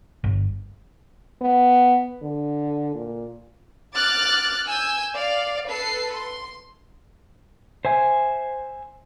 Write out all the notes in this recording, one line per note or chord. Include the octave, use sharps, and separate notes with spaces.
G1
B3
D3
A#2
D6 F6 F#6 A6
G#5 E6 G6
D5 F5
A4 B4 C7
C6
C5 E5 G#5